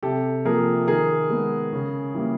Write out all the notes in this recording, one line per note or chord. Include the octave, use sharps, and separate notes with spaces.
C3 G4 A4
F3 A#3 G#4 A#4
D#3 G#4 A#4
G#3 B3
C#3
E3 G3 A#3